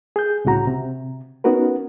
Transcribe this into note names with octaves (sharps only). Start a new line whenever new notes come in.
G#4 G6
C2 A2 C#3 F#4 A#5
C3
B3 C#4 D#4 F#4 A#4 B4